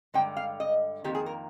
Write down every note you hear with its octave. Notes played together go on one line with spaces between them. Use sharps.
G2 D3 G#3 G5
F5
D#5
F2 D#3 A#3 G4
G#4
A#4